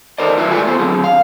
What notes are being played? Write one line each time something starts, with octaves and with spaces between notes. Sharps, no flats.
D#4 A4 A#4 C5 D5 D#5
F#3 E4 F4 A#4 B4 E5
G#3 A3 F4 F#4 D5 G#5
B3 F4 A4 C5
D3 F#3 C4 G#4
F5